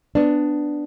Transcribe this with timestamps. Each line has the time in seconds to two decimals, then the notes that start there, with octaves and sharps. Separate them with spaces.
0.15 B3 D4